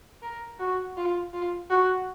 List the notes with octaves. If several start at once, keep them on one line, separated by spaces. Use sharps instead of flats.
A#4
F#4
F4
F4
F#4